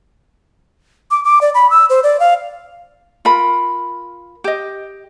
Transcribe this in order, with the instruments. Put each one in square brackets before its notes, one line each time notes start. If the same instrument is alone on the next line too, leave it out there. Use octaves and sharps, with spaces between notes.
[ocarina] D6
D6
D5
B5
E6
C5
D5
F5
[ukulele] F4 A#4 B5
G4 D#5